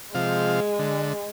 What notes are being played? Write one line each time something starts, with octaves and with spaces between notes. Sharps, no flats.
C3 F3 G#3 F5
D3